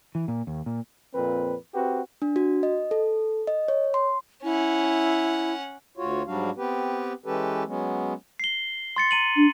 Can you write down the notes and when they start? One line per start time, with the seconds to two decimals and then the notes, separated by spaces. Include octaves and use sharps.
0.15 E3
0.28 A#2
0.47 D#2
0.66 A#2
1.15 F2 A#2 C4 B4
1.75 C4 F#4 G4 B4
2.22 D4
2.36 F#4
2.63 D#5
2.91 A4
3.47 D#5
3.68 C#5
3.94 C6
4.44 C#4 E4 F#5
5.97 D2 F4 F#4 C#5
6.27 G#2 F#3 G3 D4 F#4 F5
6.57 B3 C4 G4 B4
7.26 E3 G#3 C#4 G4 A4 B4
7.67 F#3 G#3 B3 C#4
8.39 C7 G7
8.96 C6 A6 C#7
9.11 A#5 D#7 F#7
9.36 D4